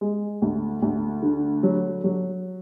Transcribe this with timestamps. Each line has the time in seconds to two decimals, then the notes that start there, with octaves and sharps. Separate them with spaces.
0.01 G#3
0.42 D2
0.82 D2
1.22 D3
1.63 F#3
2.04 F#3